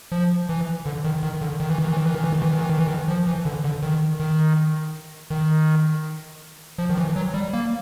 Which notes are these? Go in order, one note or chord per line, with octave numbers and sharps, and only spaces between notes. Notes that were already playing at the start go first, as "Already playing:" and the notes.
F3
E3
D3
D#3
D#3
D3
D#3
E3
D#3
E3
D#3
E3
D#3
E3
D#3
E3
D#3
E3
D#3
E3
D#3
F3
E3
D3
D3
D#3
D#3
D#3
F3
D#3
E3
F#3
G3
A#3